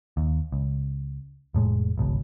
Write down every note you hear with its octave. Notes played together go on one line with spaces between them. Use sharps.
D#2
C#2
F1 A2 G#3
G#1 C#2 B2